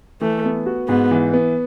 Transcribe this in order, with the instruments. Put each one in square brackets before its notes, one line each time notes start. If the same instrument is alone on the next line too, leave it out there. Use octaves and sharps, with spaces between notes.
[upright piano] E3 [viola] A3
[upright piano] B3
F#4
[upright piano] G#2 [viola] B3
[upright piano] E3
B3